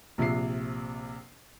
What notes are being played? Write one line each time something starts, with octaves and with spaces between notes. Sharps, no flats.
A#1 C3 F3 E5 C7